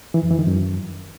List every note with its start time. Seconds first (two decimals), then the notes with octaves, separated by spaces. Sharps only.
0.14 E3
0.22 F2
0.31 E3
0.39 D#3
0.47 F#2